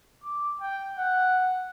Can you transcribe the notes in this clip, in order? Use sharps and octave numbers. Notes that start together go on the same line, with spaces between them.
D6
G5
F#5